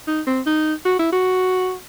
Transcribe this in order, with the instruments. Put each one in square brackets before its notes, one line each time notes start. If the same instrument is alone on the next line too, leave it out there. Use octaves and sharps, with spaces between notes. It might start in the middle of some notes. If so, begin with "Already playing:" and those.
[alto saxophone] D#4
C4
D#4
F#4
E4
F#4